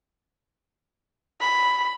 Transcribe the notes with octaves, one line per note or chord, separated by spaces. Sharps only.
B5